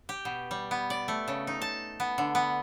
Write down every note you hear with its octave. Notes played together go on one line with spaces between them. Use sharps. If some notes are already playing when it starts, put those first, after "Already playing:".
G4
B2
G3
B3
D5
A3
C#3
D#4
A5
B3
D3
B3